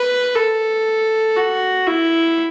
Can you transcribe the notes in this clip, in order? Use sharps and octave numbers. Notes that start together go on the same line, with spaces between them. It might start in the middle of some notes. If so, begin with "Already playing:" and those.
Already playing: B4
A4
F#4
E4